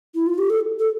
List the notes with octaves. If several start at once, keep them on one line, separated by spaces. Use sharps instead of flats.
E4
F4
G4
A4
A4